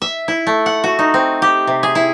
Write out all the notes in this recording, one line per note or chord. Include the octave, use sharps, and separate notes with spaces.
E5
E4
A3
F#5
F#4
D#4
C4
G4
C3
G#4
E4